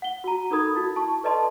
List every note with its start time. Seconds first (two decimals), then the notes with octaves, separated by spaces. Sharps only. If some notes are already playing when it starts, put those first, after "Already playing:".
0.02 F#5 G7
0.24 F#4 A#5
0.51 D#4 A4 A#4 B5 D#6 G#6
0.76 E4 F#4
0.96 A5 C#6
1.23 A4 B4 D5 D#5 A5 C6